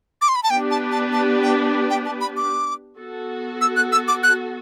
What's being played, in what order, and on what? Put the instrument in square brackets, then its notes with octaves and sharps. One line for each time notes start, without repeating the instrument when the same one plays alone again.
[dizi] D6
C6
B5
A5
[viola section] B3 D4 G4 B4 [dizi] G5
[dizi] A5
A5
A5
G5
G5
A5
B5
D6
[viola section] B3 F#4 A4
[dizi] E6
F#6
E6
D6
F#6